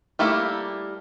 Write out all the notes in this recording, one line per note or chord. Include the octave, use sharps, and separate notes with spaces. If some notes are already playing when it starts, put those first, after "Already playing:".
G3 A3 A#3 E4